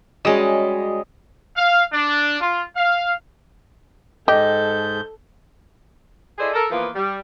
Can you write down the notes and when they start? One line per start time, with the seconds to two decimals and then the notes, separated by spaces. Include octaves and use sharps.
0.25 G3 G#3 C#4 F#4 G#4 D#5
1.56 F5
1.93 D4
2.40 F4
2.75 F5
4.28 G#2 G4 A4 D#5 G6
6.38 E4 G#4 A4 C5 D5 D#5
6.54 A4 A#4
6.71 E3 F3 A#3 B3 F4 B4
6.95 G3